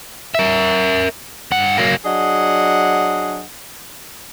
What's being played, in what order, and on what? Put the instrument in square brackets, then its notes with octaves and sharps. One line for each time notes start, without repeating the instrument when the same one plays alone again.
[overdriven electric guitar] A#4 E5
G2 F#5
F#3 A#3
[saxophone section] F#3 D4 G#4 D#5 F#5